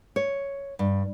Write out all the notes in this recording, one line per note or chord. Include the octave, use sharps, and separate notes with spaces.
C#5
G2